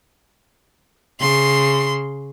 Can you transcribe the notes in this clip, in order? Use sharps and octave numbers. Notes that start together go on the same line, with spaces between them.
C#3 C6